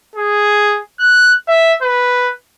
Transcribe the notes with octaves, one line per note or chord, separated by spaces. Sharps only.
G#4
F#6
E5
B4